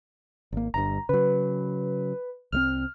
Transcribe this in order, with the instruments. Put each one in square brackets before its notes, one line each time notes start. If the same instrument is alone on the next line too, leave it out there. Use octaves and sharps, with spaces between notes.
[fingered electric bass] G#1 A#3
[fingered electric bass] G1 G2 [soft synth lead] A#5
[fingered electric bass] C#3 F#3 [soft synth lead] B4
[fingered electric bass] C2 G#3 C4 [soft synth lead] F6